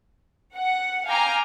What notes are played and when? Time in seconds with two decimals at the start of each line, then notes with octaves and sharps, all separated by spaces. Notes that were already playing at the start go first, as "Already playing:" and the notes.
0.56 F#5
1.08 F5 G5 G#5 A#5 D6 F6